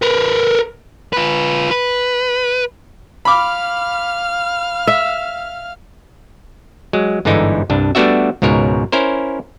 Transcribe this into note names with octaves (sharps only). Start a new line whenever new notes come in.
A#4 B4
F4 B4
B4
F5 B5 D6 F6
E5
F#3 G#3
G1 G#2 D3 E3 D#4 E4
C2 G2 D4
G3 A3 B3 D4 F#4 E5
C#2 G#2 B2 A#4 C#5
C#4 E4 A#4 C5